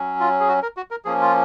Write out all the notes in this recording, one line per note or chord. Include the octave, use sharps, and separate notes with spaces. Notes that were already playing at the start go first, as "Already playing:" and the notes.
Already playing: F#3 C#4
F4
G#4
F#4
A#4
F#4
A#4
F3 A#3 C#4 G#4
F4